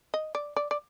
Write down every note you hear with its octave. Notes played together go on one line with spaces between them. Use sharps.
D#5
D5
D5
D5